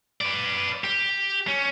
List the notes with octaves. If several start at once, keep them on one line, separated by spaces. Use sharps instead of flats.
B4 D5
G4
C#4